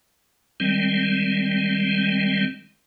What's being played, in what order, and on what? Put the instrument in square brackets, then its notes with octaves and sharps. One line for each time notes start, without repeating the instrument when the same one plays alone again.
[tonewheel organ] D#3 G3 G#3 C4